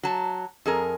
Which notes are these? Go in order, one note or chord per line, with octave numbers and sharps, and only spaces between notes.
F#3 A5
F2 G#4 A#4